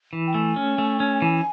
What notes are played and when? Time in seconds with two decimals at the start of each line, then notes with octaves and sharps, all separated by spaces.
0.13 E3
0.27 G5
0.34 A3 G#5
0.56 C#4
0.78 A3
1.00 C#4
1.22 E3